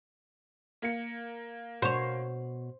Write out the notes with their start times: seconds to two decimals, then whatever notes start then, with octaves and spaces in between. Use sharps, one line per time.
0.82 A#3 C#7
1.82 B2 C5 C#5